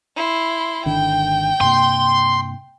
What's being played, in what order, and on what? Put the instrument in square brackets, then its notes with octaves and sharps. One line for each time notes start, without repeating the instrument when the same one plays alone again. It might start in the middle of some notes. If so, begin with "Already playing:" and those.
[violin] E4 C6
[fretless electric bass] G#1 D3 D#3 [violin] G5
[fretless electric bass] G2 C3 A#3 [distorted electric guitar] C6